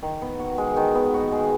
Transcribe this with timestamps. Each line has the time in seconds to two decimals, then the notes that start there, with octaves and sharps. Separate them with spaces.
0.03 D#3
0.22 B3
0.40 F#4
0.58 G#3
0.77 D#3
0.95 B3
1.14 F#4
1.32 G#3